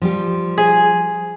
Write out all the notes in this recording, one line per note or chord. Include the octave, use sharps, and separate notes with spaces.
F3 G3 G4
G#4